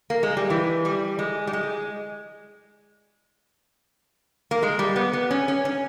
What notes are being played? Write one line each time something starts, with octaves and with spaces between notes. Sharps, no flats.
A#3
G#3
G3
E3
G3
G#3
G3
G#3
A#3
G#3
G3
B3
B3
C#4
C#4
C#4